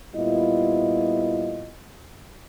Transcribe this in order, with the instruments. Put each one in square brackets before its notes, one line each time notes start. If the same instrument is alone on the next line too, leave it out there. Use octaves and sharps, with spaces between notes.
[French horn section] A#2 G3 B3 E4 F4 D#5